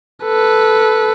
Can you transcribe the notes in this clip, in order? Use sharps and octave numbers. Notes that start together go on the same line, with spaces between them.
A4 B4